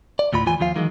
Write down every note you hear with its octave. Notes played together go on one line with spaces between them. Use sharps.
D5
D2 A2 F4 B5
D#2 E3 F4 G#5
D#2 F3 F4 F5
D#3 E3 F#3 G#3